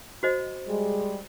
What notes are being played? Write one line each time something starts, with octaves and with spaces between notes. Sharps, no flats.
F#4 C5 D#5
G3 G#3